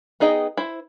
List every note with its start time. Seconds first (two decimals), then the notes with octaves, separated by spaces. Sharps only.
0.20 B3 D#4 G#4 D#5 G5
0.57 E4 C5